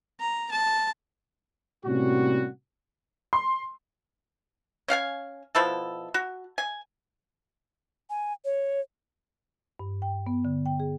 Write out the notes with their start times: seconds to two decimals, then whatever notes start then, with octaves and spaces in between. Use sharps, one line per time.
0.20 A#5
0.51 A5
1.85 A2 C3 G3 A#3 C#4 F#4
3.33 C6
4.88 C#4 F5 F#5 G#5
5.55 B2 F3 E4 A4
6.14 F#4
6.58 G#5
8.10 G#5
8.45 C#5
9.79 G2
10.02 G5
10.27 B3
10.45 D3
10.66 G5
10.80 G#4